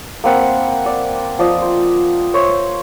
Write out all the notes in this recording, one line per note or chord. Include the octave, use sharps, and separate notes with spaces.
A#3 C4 F#5 B5
D5
F3 D5 D#5 D#6
C5
C5 C#5 E5